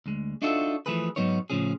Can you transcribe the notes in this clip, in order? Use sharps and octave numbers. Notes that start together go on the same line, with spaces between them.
D2 G#3
D4 D#4 F4 F#4 A4 E5
E3 F3 A3 G#4 B4
G#2 B2 F#3 B3 D#4 C#5
A2 C#3 F3 C#4 G#4